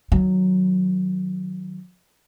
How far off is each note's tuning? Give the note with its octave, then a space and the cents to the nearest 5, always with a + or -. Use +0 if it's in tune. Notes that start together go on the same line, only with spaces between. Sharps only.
D#3 +0 F#3 +0